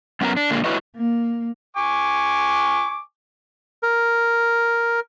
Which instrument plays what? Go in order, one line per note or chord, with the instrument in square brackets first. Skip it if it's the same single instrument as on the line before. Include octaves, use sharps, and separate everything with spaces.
[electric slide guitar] F#2 B3 C#4 F4 A#4 A#5
D4
A#2 D3 G#3 A#3
E4 F#4 B4 C#5 D#5
[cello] A#3
[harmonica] G#5 C#6 D6
[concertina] A#4